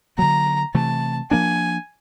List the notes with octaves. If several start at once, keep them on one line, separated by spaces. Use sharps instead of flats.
D3 F#3 A#3 A#5
C3 E3 A3 A5
F3 A#3 D4 G#5